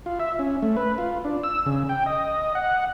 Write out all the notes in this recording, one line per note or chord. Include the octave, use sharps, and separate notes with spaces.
F4
E5
C#4
A3
B4
F4
D4
E6
C#3
G5
D#5
F#5